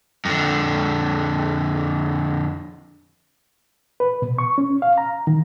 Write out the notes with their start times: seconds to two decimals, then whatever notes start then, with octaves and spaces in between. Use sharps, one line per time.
0.25 F2 D3
4.00 B4
4.22 B2
4.38 C#6
4.58 C#4
4.82 F5
4.98 A#5
5.27 D#3